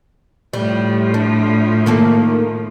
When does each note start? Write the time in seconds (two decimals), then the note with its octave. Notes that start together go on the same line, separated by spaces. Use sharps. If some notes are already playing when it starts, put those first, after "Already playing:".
0.53 A2 F3 G3
1.14 D4
1.86 D#3 A#3 A4